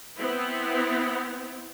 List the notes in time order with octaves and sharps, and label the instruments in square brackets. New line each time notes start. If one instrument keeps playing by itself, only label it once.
[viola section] B3 C4 E4